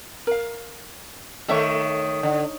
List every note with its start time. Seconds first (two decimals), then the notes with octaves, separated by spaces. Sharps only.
0.27 A#4 F5
1.49 D#3 A3 A4 C#5 D5 E5
2.23 D3